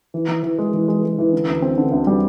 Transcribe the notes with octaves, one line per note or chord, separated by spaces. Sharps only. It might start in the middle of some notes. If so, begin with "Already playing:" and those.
E3
E3
E3
G#3
E3
G#3
G#3
E3
D3
D2
C4
D3
D2
G3